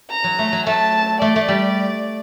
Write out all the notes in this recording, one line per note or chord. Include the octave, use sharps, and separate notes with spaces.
A#5
F#3
A3
F#3
A3 A5
A3 D5
A3
G3